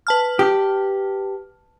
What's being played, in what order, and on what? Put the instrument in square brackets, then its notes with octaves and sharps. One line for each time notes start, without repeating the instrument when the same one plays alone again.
[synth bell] B4 A5 F6
[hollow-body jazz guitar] G4